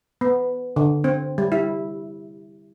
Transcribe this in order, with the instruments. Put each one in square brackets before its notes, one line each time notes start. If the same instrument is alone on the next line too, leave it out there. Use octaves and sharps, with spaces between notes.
[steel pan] B3
D3
C4
G3
E4